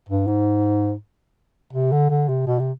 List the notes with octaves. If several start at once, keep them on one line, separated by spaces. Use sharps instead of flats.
G2
G#2
C3
D3
D3
C3
B2
C3